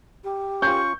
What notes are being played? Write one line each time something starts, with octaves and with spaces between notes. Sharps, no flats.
G4
C#4 F4 C#6 G6